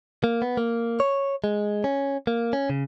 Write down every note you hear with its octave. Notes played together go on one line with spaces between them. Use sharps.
A#3
B3
A#3
C#5
G#3
C#4
A#3
C#4
C#3